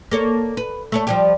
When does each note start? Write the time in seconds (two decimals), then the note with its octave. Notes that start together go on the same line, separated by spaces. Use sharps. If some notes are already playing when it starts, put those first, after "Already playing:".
0.11 A#3 A4 C#5
0.57 B4
0.92 A3 A4 C#5
1.07 F3 G3 G4